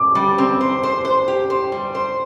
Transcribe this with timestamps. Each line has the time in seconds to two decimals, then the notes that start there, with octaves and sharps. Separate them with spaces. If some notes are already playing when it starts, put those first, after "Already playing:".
Already playing: D6
0.15 G3
0.38 C4
0.61 C5
0.83 C5
1.05 C5
1.28 G4
1.50 C5
1.72 G3
1.95 C5